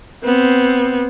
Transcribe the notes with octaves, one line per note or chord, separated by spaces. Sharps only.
B3 C4